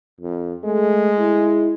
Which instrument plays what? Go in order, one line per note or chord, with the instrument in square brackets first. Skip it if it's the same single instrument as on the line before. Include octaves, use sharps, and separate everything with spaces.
[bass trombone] F2
[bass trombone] G#3 [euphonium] A3
[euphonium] E4